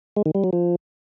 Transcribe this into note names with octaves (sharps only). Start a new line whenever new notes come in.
G#3
D#3
G3
F#3
F3